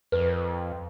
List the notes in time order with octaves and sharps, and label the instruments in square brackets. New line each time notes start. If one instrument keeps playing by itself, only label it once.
[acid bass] F2 [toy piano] B4